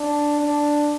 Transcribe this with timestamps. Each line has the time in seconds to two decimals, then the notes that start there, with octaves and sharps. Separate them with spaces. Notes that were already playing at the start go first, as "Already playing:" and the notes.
Already playing: D4
0.41 D4